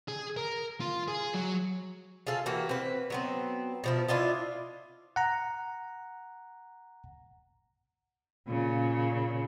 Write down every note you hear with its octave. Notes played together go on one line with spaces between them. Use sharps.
G#4
A#4
F4
G#4
F#3
F4 G#4 A4 F5
E3 A#3 F#4 G4
C4 B4
F#3 B3 C4
B2 F3 E4
D4 E4 F4 D#5
F#5 A#5
A#2 C#3